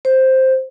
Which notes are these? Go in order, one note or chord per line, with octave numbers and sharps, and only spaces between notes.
C5